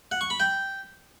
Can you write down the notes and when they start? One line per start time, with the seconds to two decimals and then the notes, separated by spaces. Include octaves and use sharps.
0.12 F#5
0.21 C#6
0.30 B5
0.40 G5